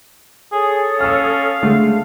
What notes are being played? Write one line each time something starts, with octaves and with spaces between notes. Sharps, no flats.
G#4 A4 C#5 D#6
C#4 F5 E6 F6
D3 G#3 A3